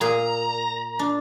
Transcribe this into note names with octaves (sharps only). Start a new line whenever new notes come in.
A#2 G#4 A#5
D4